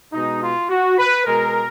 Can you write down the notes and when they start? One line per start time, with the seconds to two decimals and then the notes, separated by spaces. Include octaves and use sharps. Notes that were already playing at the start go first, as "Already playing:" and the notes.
0.13 B2 G#3 D#4
0.41 F4
0.69 F#4
0.98 B4
1.25 B2 G#3 A#4